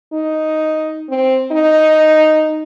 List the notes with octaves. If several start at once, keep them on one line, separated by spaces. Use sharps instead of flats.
D#4
C4
D#4